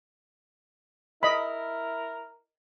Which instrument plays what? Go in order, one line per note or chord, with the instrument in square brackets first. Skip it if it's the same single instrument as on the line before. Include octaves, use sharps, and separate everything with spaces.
[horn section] E4 A#4 [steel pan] D#5 B5